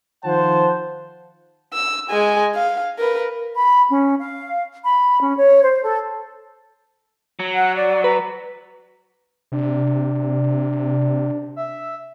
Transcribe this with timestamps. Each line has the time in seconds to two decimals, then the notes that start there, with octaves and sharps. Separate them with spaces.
0.24 D#3 F3 C5 F#5 A5
1.73 E6
2.10 G#3 G#5
2.55 F5
2.99 A#4 B4
3.56 B5
3.90 C#4
4.19 F5
4.85 B5
5.21 C#4
5.37 C#5
5.63 C5
5.84 A4
7.40 F#3
7.55 F#5
7.76 D5
8.04 B4 A#5
9.52 C3 D4
11.56 E5